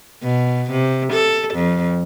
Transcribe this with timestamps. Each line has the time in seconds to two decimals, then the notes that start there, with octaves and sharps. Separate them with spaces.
0.23 B2
0.71 C3
1.13 A4
1.54 F2